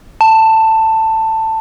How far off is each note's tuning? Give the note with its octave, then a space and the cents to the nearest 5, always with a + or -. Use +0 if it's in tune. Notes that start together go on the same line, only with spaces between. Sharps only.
A5 +15